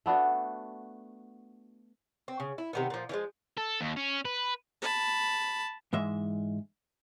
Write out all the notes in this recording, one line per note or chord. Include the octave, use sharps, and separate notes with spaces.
A3 B3 D4 F#4
C4
C#3
E4
C3 D#3 B3
A#2 F3
E3 F3 G#3
A4
D#2
C#4
B4
A5 B5
G#2 E3 G#3 E5